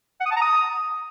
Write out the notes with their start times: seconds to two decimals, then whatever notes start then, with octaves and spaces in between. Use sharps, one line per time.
0.21 F#5
0.26 D#6
0.31 A5
0.37 A#5
0.42 D#6